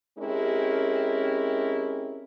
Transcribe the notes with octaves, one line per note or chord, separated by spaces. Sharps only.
G#3 C4 C#4 E4 G4 A#4